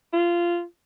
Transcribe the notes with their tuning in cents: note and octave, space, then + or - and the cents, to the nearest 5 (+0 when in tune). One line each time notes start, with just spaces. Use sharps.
F4 -15